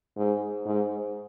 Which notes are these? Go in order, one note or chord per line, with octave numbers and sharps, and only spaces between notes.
G#2
G#2